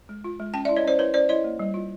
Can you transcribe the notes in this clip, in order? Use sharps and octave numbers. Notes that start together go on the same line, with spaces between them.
G#3
F4
G#3
C#4 G5 A5
E4 D5 E5
C#5 D#5
C#4 C5 D5
E4 B4 C#5
C#4 C5 D5
E4 C#5 D#5
A#3
G3
F4